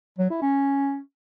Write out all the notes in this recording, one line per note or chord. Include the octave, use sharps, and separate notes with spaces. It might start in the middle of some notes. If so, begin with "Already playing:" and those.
F#3
E4
C#4